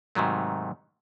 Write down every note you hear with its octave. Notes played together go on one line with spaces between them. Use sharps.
G#2 C3 D#3 F#3 A3